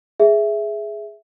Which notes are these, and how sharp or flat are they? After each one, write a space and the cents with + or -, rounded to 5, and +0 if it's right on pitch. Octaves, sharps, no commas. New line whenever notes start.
G#4 +10 E5 +0